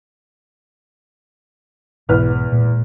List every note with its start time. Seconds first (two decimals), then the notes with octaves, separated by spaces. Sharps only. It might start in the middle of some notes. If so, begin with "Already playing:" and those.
2.09 B1 E2 G#2 B2 B4 F6
2.52 A#2 G#3 A#3